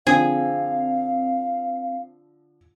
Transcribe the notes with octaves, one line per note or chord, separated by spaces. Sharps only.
D3 F3 C4 G#4 F5